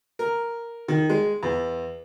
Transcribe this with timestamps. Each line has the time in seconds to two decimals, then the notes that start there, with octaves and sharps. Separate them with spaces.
0.19 A#4
0.88 D#3
1.10 G#3
1.43 E2